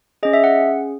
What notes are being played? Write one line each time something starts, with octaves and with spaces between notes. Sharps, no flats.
C#4 G#4 D#5
E5
F#5